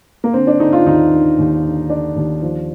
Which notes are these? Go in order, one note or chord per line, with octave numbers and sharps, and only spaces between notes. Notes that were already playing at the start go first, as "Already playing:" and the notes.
A#3
D3 C4
D4
D3 D#4
F4
D#2 D#4
D3
D#2
D3
D3 D4
D#2
F3